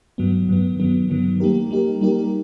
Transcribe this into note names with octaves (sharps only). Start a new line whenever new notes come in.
G2 D#3 F#3 B3
G2 D#3 F#3 B3
G2 D#3 F#3 B3
G2 D#3 F#3 B3
G3 A#3 D#4 G4 A#4
G3 A#3 D#4 G4 A#4
G3 A#3 D#4 G4 A#4